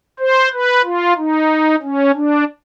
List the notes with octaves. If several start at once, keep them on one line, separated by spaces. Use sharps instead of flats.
C5
B4
F4
D#4
C#4
D4